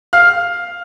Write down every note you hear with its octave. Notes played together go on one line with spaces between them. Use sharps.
F5 F6